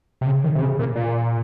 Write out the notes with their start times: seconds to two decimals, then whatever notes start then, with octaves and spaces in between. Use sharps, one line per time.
0.21 C3
0.27 C#3
0.44 D#3
0.55 C3
0.62 C#3
0.79 A#2
0.96 A#2